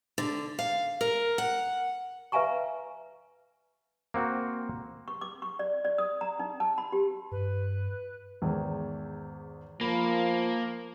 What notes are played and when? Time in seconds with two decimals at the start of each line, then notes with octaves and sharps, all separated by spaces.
0.18 D3
0.59 F5
1.01 A#4
1.38 F#5
2.32 B4 E5 F5 G#5 A#5 C#6
4.14 A#3 C4 F#4
5.08 C#6
5.21 D6
5.42 C#6
5.59 D5
5.85 D5
5.98 D#6
6.21 A#5
6.39 D#4
6.60 A5
6.78 B5
6.92 G4
7.32 G2 B4
8.42 E2 G#2 D#3
9.81 F3 A#3 B5